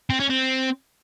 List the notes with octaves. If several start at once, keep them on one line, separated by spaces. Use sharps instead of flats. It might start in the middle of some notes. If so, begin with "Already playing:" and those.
C4
C#4
C4